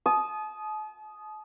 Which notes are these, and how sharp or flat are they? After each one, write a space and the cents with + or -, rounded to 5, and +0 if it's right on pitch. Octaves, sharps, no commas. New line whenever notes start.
A5 -40 D#6 +0